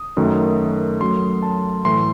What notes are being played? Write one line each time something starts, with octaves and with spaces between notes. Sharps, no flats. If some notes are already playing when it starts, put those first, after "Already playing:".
Already playing: D#6
F#2 D#3 A3
F#2 F#3 A3 C6
A5
A2 E3 A3 C6